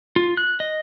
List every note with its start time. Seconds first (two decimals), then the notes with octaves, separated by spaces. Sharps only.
0.16 F4
0.37 F#6
0.60 D#5